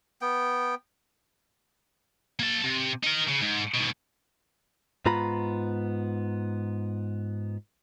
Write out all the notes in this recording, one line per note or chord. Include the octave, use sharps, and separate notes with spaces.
B3 G5
A#3 A5
C3
D#4 A#4
C#3
G#2
G#2 B2
G#2 B3 F4 A#5 B5